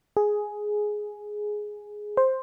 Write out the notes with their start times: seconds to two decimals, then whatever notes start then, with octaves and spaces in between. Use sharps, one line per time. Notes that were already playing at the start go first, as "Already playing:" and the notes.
0.17 G#4
2.17 C5